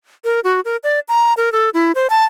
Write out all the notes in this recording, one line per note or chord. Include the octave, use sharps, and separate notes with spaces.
A#4
F#4
A#4
D5
A#5
A#4
A4
E4
C5
A5